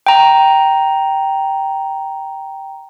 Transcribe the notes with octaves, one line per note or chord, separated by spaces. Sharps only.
G5 A#5